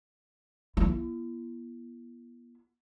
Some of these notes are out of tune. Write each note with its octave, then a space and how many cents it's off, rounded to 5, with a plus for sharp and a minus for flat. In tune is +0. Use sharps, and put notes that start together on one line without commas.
B3 -40 E4 +40